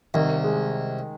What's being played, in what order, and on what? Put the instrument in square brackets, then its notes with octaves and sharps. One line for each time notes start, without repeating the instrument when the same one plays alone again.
[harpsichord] C2 [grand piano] D#3
[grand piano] G#3